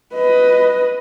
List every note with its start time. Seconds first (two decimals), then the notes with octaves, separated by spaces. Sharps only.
0.13 B4 D#5